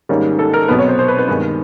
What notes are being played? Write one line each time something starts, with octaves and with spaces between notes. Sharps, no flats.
G#2 D#3 G3 A#3 C#4
A4
A#4
C2 B2 F#3 B3 B4
C#5
C5
C5
B4
B4
G2 D#3 G#3 B3